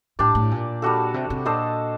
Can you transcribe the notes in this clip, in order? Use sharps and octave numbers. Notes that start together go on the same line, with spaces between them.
A2 D4 G4 D5
A2
A#2
G3 D4 F#4 A4
C3
C3
A#2 D4 A4 C5 D#5